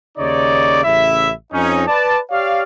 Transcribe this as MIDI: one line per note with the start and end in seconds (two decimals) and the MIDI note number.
0.18 0.82 39
0.18 0.82 49
0.18 0.82 63
0.18 0.82 73
0.18 0.82 74
0.84 1.31 33
0.84 1.31 49
0.84 1.31 64
0.84 1.31 76
1.52 1.84 41
1.52 1.84 61
1.52 1.84 63
1.87 2.19 71
1.87 2.19 74
1.87 2.19 81
2.30 2.63 67
2.30 2.63 73
2.30 2.63 74
2.30 2.63 77